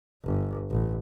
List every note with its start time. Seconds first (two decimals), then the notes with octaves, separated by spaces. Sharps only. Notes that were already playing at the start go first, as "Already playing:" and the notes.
0.24 G1
0.71 A1